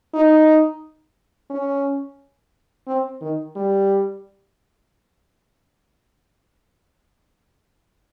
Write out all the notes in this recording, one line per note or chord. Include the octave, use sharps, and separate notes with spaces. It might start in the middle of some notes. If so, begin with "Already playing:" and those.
D#4
C#4
C4
D#3
G3